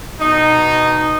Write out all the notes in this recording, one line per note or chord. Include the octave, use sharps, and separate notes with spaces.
B2 D#4